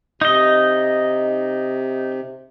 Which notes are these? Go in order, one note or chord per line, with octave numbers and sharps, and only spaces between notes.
C3 D#4 D#5